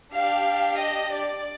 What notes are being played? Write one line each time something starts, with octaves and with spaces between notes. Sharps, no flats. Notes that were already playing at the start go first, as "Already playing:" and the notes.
D4 G4 F5
D#5
D5